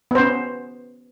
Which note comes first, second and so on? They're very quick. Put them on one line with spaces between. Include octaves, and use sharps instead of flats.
B3 C5 C#4